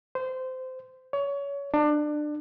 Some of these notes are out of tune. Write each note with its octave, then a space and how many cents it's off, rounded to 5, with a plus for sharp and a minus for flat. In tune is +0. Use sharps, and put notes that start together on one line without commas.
C5 -20
C#5 +25
D4 +25